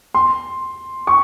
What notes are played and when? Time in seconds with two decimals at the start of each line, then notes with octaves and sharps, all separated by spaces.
0.14 C6
1.07 C#6